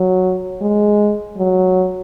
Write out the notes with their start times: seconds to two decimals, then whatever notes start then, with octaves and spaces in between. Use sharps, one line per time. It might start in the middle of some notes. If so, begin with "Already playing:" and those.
Already playing: F#3
0.62 G#3
1.37 F#3